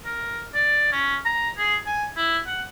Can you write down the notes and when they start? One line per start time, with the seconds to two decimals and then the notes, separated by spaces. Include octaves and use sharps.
0.05 A#4
0.54 D5
0.92 C#4
1.25 A#5
1.58 G#4
1.86 G#5
2.16 E4
2.47 F#5